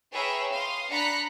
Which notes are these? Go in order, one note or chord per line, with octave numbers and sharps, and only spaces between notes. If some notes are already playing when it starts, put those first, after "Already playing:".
G#4 B4 C#5 E5 G5 A#5
F5 C6 D#6
D4 A#5 B5 F#6 B6 C#7